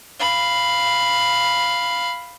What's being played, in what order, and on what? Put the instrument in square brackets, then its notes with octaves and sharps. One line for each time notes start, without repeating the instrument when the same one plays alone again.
[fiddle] F5 B5